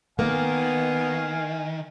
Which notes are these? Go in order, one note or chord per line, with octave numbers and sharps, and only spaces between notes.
D#3 A#3 B3 A#4 F5 G#5